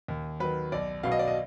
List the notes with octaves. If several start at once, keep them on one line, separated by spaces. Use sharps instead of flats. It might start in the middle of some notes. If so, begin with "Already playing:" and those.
D#2
D#3 F#3 B4
B1 D5
B2 F#3 F5
D#5
D5
D#5